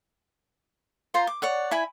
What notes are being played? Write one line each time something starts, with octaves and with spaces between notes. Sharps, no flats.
F4 C5 A#5 C6
D6
C#5 D5 F#5
E4 G#5 B5